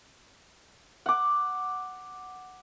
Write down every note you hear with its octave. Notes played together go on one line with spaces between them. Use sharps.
F#5 D6